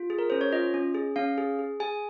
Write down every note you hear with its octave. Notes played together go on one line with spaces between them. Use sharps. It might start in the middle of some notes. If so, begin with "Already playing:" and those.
Already playing: F4
G#4
A#4
C#4 C5
C#5
F4 D#5
C#4
G#4
C#4 F5
G#4
G#4
G#4 G#5